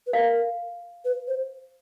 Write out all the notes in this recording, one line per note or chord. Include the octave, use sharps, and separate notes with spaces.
B4
A#4 F5
B4
C5